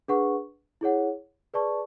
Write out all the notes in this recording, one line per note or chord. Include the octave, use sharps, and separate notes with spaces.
D4 G#4 B4 F#5 C#6
E4 G#4 C#5 F#5
G#4 B4 D5 A5 C#6